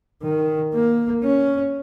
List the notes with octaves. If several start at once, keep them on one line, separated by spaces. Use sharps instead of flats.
D#3
A#3
C#4